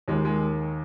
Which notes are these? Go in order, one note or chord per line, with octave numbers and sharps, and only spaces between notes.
D#2 D#3 G#3
G#3